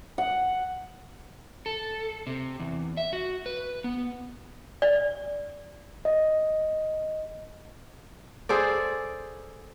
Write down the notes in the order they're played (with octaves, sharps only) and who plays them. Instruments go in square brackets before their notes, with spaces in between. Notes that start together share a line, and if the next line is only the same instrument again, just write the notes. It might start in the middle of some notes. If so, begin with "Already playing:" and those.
[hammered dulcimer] F#5
[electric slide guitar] A4
C3
E2
E5
F#4
B4
B3
[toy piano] D5
[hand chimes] D#5
[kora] G#4 A4 C5 D5